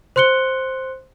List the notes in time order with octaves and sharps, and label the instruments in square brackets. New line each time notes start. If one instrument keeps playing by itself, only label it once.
[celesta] C5 C6 F#6 C#7 G7